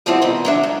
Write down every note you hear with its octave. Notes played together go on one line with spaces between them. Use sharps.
F3 G3 B3 C4 E4 F#4
B2 D#3
F#3 D4 E5
G#2